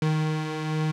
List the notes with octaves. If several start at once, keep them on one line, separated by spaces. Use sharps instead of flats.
D#3